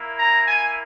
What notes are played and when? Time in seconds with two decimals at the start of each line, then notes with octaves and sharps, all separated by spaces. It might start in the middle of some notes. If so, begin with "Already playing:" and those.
Already playing: A#3 E4
0.19 A#5
0.47 G#5